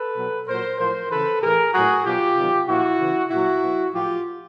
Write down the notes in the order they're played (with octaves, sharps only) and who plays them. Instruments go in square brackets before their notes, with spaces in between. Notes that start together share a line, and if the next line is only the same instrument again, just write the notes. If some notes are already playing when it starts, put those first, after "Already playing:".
Already playing: [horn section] A4 B4
B2 F#3
A#2 F#3 A#4 C5
A2 F3 A#4 C5
C#3 E3 A4 B4
A2 E3 G#4 A#4
A2 F#3 F#4 G#4
B2 F#3 F4 G4
C3 D#3 F#3
A#2 F3 E4 F#4
C#3 E3
A#2 F#3 E4 F#4
B2 F#3
A2 F3 F4 G4